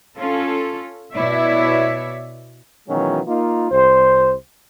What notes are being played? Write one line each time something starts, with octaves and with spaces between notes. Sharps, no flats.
C#4 F4 A4
B2 E4 C#5 D5 E5
B2 D#3 E3 F#3 G#3 C#4
A#3 D#4 F4
C2 C5